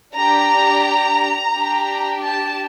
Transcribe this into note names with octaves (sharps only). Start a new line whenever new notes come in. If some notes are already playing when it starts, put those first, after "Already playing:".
D4 G4 A#5
D4 G4
A5